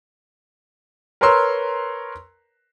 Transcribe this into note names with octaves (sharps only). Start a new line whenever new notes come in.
A#4 B4 C#5 A#5 C6 E6